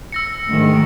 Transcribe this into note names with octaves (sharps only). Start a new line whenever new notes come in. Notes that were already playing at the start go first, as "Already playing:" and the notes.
E6 A#6 C#7
D2 G#2 D#3